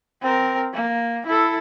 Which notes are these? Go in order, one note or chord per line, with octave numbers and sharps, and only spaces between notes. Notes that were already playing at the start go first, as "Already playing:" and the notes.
C4 A#4
A#3
E4 A4